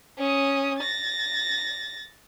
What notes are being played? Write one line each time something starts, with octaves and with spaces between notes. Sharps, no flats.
C#4 D#6
A6 A#6